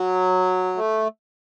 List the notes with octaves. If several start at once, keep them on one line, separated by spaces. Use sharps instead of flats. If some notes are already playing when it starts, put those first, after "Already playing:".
Already playing: F#3
A3